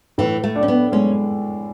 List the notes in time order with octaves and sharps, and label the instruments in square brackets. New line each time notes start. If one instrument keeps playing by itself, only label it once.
[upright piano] A2 [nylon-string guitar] E3
[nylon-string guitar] A3
[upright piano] D4
[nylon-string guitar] C#4
B3
[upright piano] G#3 [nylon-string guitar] C#4